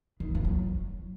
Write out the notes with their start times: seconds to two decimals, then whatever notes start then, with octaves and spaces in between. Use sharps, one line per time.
0.20 D#3
0.35 F3
0.44 F#3